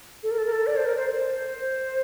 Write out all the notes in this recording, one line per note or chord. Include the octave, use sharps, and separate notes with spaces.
A4
A#4
A4
A#4
A4
D5
C5
A#4
C5
C5